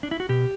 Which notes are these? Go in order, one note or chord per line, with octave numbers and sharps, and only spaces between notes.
D4
E4
F#4
B2 G4